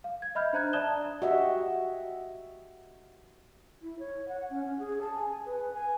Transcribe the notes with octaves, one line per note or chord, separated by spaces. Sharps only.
F5
G#6
D#5 E5 B5 F6 G6
D4 C5 A#5 F#6 G#6
D5 E5 A5 D#6 E7 G7
F#4 G4 D#5 E5
E4
C#5
F#5
C#4
C#4
G#4
A5
G#5
B4
G#5